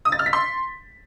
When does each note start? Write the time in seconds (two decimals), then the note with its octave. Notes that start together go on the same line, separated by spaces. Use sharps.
0.05 D#6
0.12 A6
0.19 F6
0.26 B6
0.33 C6